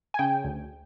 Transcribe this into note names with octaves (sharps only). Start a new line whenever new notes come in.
G#5
C#3 G5
D2